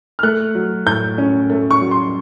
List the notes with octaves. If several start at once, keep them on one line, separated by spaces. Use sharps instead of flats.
F6
A3 F#6
F#3
A2 G6
C#4
A3
C#6
F#3
C6